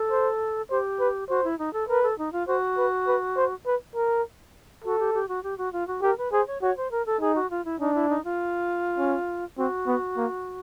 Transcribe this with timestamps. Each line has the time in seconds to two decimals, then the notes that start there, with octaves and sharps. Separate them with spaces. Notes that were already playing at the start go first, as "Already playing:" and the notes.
Already playing: A4
0.11 C5
0.70 G4 C5
1.00 B4
1.29 F#4 C5
1.44 E4
1.59 D#4
1.73 A4
1.88 A#4 B4
2.03 A4
2.18 D#4
2.32 F4
2.47 F#4 C5
2.78 B4
3.07 B4
3.36 C5
3.66 B4
3.96 A#4
4.84 F#4 A4
4.99 G4
5.14 G4
5.28 F#4
5.43 G4
5.58 F#4
5.73 F4
5.87 F#4
6.02 G4 A#4
6.18 B4
6.32 G#4 C5
6.47 C#5
6.62 F#4 C#5
6.77 C5
6.91 A#4
7.06 A4
7.21 D#4 G#4
7.35 F#4
7.50 F4
7.65 E4
7.80 D4 D#4
7.95 E4
8.09 D#4
8.24 F4
8.98 C#4
9.57 C4 F#4
9.87 B3
10.17 A#3